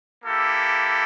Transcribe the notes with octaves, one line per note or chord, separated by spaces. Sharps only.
A#3 E4 G4 A4